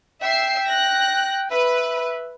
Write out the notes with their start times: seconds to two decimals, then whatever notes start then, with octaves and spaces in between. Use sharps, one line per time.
0.23 E5 G5 C7
0.67 F#6 A#6
1.51 B4 E5